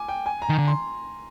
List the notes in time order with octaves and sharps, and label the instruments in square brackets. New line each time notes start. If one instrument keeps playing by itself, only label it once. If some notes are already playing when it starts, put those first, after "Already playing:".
Already playing: [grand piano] G#5 D6
G5
G#5
A#5
[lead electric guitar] D#3
D3
[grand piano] C6